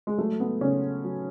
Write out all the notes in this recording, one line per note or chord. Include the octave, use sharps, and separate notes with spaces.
G#3
F#3 A3
B3
C#3 C#4
F#3